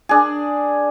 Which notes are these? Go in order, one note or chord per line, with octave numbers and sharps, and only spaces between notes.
D4 G#4